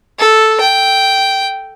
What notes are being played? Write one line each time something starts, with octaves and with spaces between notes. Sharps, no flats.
A4
G5